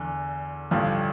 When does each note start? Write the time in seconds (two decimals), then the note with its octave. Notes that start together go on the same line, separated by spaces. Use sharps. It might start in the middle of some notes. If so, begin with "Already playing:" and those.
Already playing: E2 D3
0.71 A1 G2 D3 F3